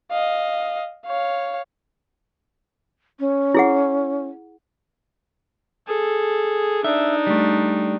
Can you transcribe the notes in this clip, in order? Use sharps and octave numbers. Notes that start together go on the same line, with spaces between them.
D#5 F5
C#5 F5
C#4
E4 G#4 F#5
G#4 A4
D4 D#4 E5
G3 A3